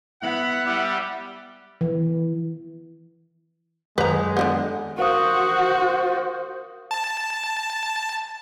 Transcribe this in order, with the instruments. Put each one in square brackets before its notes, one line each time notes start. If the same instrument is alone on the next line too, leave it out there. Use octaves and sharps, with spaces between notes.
[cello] B3 [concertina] E4 [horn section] F#5 [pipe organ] B5
[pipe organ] G3 G4 [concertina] E5
[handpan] E3
[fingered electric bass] F#2 D#3 F#3 [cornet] G#3 [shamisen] B4 A#5
[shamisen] D3 G3 B3
[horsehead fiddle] F#4 [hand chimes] A#4 F5 D#6 [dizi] C5
[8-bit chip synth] A5